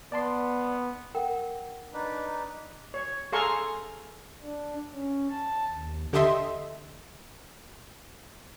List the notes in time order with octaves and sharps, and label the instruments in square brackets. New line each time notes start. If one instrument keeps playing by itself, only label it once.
[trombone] B3 [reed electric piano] D5 A5 C6
[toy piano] A#4 F#5 G5
[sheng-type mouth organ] D4 D#4 B4
[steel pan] C#5
G#4 A4 F5 A#5 C6 C#6
[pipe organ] D4
C#4
A5
D#2
[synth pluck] D3 G4 A4 D#5 E5 C6